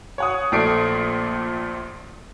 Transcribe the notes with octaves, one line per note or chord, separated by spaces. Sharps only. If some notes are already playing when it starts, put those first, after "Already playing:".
C#5 F#5 D#6
A#1 A#2 A3 D5 C7 D7